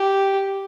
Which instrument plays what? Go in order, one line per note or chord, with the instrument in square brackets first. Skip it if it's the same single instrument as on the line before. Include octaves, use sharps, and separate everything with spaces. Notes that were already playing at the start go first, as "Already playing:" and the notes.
Already playing: [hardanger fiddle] G4